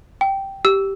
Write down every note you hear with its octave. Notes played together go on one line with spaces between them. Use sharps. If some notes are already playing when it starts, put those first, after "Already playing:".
G5
G4 E6